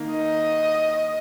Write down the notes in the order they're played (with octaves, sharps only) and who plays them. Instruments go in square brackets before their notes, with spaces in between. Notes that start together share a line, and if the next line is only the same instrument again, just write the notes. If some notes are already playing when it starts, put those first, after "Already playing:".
Already playing: [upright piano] D#3 A#3 D#4
[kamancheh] D#5